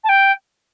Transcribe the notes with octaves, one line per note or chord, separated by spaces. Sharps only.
A5
G5